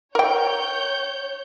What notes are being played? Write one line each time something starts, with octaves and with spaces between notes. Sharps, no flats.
A#4 C#5 G5 G6